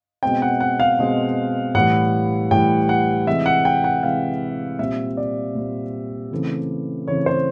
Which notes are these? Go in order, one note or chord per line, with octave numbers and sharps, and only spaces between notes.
B2 G#3 C4 G5
F#5
F#5
F5
B2 G#3 C4
A2 E3 G3 F#5
A2 E3 G3 G5
F#5
C3 E3 G#3 E5
F#5
G5
F#5
C3 E3 G#3 F5
A#2 G3 C4 E5
D5
A#2 G3 C4
C#3 E3 A3 C4
C#3 E3 A3 C4 C#5
C5